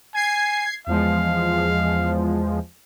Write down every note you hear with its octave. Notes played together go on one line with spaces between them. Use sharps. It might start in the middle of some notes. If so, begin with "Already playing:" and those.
G#5 G#6 C7
E2 F3 G#3 F5